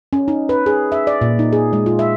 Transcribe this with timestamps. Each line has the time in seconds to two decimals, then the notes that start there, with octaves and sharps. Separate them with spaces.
0.13 C#4
0.28 D#4
0.49 B4
0.66 G#4
0.92 E5
1.07 D5
1.21 A#2
1.39 D#4
1.53 G#4
1.73 G#3
1.86 F4
1.99 E5